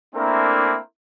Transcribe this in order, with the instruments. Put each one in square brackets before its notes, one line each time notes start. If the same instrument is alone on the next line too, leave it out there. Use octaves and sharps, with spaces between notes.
[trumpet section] A3 A#3 C4 D4 E4 A#4